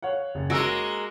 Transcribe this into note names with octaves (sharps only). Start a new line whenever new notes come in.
C#5 F5 F#5
F#1
G#3 A#3 F#4 A#4 E6 D7